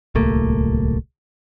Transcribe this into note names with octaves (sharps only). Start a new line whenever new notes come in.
D1 C2 A3 A#3